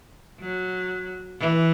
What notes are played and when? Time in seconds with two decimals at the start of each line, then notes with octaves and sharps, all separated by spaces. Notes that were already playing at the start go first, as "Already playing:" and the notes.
0.40 F#3
1.39 E3